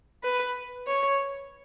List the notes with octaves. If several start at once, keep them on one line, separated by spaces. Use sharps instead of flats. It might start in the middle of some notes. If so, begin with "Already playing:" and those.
B4
C#5